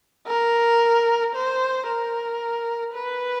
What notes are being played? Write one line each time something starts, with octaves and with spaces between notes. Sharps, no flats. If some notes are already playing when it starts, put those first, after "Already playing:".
A#4
C5
A#4
B4